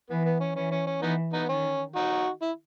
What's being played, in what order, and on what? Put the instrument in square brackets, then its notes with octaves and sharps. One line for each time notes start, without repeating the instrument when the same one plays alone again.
[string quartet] E3 [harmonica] B3
[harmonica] B3
C#4
[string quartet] E3 [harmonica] C#4
[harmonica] C#4
C#4
[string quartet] E3 [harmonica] B3 D#4
[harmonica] B3 D#4
[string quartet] D#3 [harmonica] C#4
[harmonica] D#4 F#4
E4